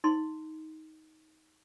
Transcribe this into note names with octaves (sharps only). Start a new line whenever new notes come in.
D#4 C6